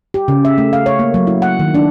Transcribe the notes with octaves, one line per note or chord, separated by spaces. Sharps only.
G4
C#3
E5
A3
F5
C#5
A#3
F#3
E4
F#5
D#3
D4